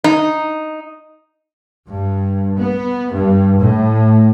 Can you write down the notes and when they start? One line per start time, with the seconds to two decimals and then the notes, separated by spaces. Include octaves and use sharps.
0.04 D#4
1.87 G2
2.57 B3
3.12 G2
3.59 A2